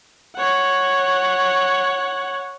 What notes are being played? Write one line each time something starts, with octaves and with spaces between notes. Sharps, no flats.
C#5 F#5